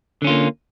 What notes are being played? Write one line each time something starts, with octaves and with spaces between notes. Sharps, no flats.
D3 A#3 C#4 F4